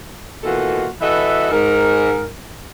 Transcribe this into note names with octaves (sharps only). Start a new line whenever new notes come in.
B2 E3 A#3 F4 F#4 A4
E3 F#4 A4 B4 D#5 E5
G#2 A#4